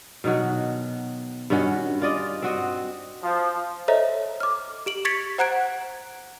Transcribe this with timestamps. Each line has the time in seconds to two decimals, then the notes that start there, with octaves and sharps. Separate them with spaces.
0.24 B2 D#3 F#3 F#4
1.50 G2 D#3 C#4 F#4
2.02 F4 D5 D#5
2.42 C4 F#4 D#5
3.24 F3
3.88 A4 C5 C#5 D#5 E5 A#5
4.40 D6 F6
4.86 G4 D7 F#7
5.05 C#6 G#6 A6 B6 C#7 D7
5.38 C5 F#5 A#5 F#6 G#6 D7